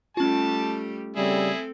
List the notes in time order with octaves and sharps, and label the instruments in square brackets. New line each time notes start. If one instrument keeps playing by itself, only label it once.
[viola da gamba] G3 A3 G4 [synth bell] C#4 F4 [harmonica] A5
[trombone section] C#3 G3 [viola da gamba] C4 A4 [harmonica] E4 G#4